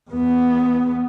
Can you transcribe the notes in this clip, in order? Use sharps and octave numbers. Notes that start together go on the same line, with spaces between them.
E2 B3